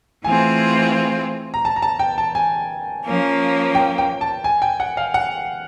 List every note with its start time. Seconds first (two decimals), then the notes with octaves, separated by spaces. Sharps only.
0.24 E3 A3 C4 F4 G#4 G#5
1.54 A#5
1.65 A5
1.76 A#5
1.82 A5
1.99 G5
2.18 A5
2.35 G#5
3.05 F3 A#3 C#4
3.75 G5
3.98 G5
4.21 A5
4.44 G#5
4.62 G5
4.80 F#5
4.97 F5
5.14 F#5